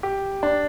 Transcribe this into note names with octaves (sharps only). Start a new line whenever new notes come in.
G4
D4